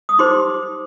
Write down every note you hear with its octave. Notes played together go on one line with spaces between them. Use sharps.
D#6
D#4 G4 C5 C6 D6